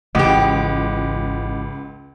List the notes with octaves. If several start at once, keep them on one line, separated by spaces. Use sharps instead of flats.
G#1 C#2 E3 F3 G4 D#5 F#5 D6